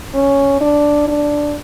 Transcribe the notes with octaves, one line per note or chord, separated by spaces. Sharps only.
C#4
D4
D4